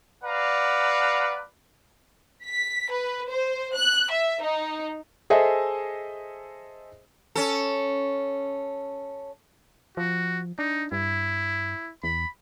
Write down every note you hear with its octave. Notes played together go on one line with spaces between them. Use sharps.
B4 D5 F5 F#5 A#5
B6
B4
C5
F#6
E5
D#4
G#4 A4 C5 D#5 E5 G#5
C#4 A4
F3 F#4
D4 D#4
G2 E4
E2 B5